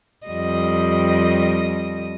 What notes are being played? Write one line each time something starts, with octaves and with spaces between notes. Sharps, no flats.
F2 G3 D#5